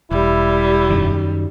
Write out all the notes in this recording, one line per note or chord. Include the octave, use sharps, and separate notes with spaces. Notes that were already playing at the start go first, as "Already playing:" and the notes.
E1 G3 E4
F#2 D#3